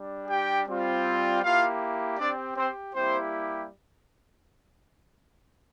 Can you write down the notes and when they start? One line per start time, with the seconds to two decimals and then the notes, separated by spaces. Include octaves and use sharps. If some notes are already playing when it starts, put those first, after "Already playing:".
Already playing: G3 D4
0.28 G4 G5
0.67 G3 C4 F4
1.42 A#3 E4 F4 G4 F5
2.18 C4 D4 G4 D5
2.56 C4 C5
2.94 G3 A#3 C4 E4 G4 C5